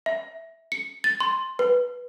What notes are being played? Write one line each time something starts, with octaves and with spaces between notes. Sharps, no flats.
E5
C#7
A6
C6
B4